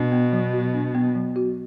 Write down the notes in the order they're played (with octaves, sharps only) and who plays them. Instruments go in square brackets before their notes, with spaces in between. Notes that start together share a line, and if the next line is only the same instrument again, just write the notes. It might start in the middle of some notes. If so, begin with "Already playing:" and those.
Already playing: [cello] B2 [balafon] D4
[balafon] B3
F#3
F#4
D4
B3
F#3
F#4